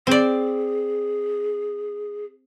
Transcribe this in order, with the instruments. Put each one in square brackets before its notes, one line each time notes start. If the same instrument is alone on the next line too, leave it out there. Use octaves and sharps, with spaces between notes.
[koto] C4 D5 [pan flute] G#4